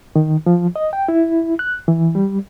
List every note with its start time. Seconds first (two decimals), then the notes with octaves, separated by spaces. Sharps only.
0.16 D#3
0.46 F3
0.76 D#5
0.93 G5
1.08 E4
1.59 F#6
1.88 E3
2.15 G3